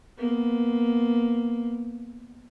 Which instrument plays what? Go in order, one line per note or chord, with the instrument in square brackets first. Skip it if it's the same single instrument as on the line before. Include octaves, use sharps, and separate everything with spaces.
[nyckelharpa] A#3 B3